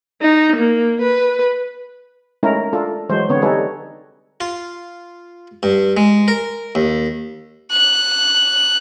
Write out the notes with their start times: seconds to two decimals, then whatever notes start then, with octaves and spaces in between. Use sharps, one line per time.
0.22 D#4
0.56 A#3
1.01 B4
2.43 G#3 A3 C#4 D#4 E4 A#4
2.73 D4 F4 A4
3.09 E3 F#3 G#3 C5
3.29 D3 B3 C4 C#5
3.42 G3 D#4 G#4 A4 B4 C#5
4.41 F4
5.63 G2
5.97 G#3
6.28 A#4
6.75 D#2
7.72 F#6